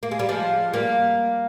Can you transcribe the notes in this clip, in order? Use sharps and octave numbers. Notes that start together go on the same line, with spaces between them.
A#3
G#3
G3
F3 G#3
G3 A#3